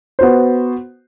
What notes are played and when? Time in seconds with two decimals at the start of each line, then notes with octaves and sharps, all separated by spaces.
0.19 B3 F#4 C5